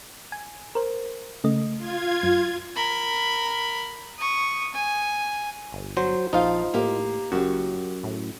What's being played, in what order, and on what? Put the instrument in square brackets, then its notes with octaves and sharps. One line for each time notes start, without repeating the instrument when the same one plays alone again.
[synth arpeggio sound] G#5
A#4 C5
C#3 A3 D#5
[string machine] F4 G#6
[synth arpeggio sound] F#2
[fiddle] A#4 B5
C#6 D#6
G#5
[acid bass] G1
[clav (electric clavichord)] F#3 C5
[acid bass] A#1 [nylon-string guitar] F3 F5 [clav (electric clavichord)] D#4 F4
[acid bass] A2 [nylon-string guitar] A#3 G4 A#4
[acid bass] F#1 [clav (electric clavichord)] F#2 [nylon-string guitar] F#4 G4
[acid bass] A2